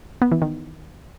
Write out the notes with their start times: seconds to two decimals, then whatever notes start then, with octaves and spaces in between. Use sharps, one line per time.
0.22 B3
0.32 E3
0.42 D#3